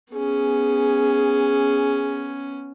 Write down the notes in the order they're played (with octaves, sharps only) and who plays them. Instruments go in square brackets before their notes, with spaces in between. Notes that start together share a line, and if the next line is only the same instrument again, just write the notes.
[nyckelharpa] B3 C#4 [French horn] G#4